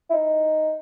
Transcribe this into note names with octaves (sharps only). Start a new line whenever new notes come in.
E4
D#4